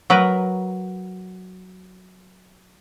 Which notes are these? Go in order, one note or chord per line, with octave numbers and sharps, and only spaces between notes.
F#3 A#4 B4 A#5